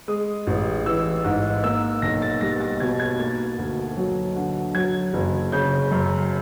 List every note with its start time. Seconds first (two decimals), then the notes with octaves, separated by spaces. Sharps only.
0.08 G#3 D#6
0.47 A1
0.86 E3 E6
1.24 G#2
1.63 A#3 E6
2.02 B1 A#6
2.22 A6
2.41 G3 A#6
2.61 A6
2.80 B2 G#6
3.00 G#6
3.19 A#3 A6
3.58 D2
3.97 F#3
4.36 D3
4.75 F#3 G#6
5.13 F#1
5.52 C#3 G6
5.91 F#2